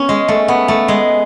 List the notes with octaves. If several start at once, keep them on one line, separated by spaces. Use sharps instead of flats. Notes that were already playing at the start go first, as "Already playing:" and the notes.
Already playing: B3 C#4
G#3
A3
B3
A3
G#3